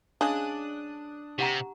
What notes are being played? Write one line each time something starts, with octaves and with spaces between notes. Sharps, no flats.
C#3 G#3 D4 D#6 F#6
C3 G4 F#5 A#5